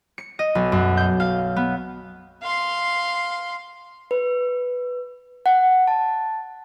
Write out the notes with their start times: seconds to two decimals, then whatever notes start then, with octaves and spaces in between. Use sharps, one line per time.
0.18 C#7
0.39 D#5
0.55 B1
0.72 F#2
0.97 G6
1.20 F5
1.56 B3
2.42 F5 C6
4.11 B4
5.46 F#5
5.87 A5